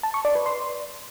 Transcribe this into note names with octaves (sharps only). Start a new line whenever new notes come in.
A5
C#6
D5
B4
C6